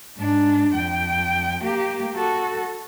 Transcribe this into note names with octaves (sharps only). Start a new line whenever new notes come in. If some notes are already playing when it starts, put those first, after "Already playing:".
G#2 D4
F2 G5
A#3 G4
F#4 A4